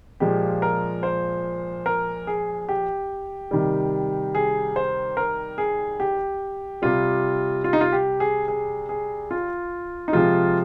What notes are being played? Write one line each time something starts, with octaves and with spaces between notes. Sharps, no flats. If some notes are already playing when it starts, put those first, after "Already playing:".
A#2 F3 G#3 G4
A#4
C5
A#4
G#4
G4
C3 D#3 G3
G#4
C5
A#4
G#4
G4
C3 G3 F4
F4
D#4
F4
G4
G#4
G#4
G#4
F4
D#4
C3 F3 G#3 F4